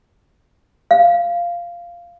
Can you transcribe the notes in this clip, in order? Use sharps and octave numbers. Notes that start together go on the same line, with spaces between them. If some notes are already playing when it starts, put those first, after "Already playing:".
F5